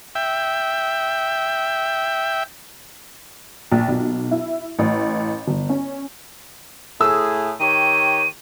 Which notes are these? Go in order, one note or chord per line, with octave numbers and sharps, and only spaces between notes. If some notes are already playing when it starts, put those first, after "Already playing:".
E5 G5
A#1
B1
E4
A1
G1
C#4
A2 G#4 E6
D#3 G4 C#5 D#7